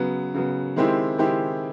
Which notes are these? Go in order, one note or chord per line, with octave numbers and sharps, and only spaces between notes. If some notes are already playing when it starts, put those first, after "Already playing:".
Already playing: C#3 F#3 B3
C#3 F#3 B3
D#3 G#3 C4 E4 G4
D#3 G#3 C4 E4 G4